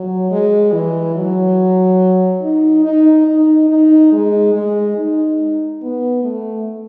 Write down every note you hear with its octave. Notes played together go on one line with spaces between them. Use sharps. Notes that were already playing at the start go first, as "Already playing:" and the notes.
Already playing: F#3
G#3
E3
F#3
D#4
D#4
D#4
D#4
G#3
G#3
D#4
B3
A3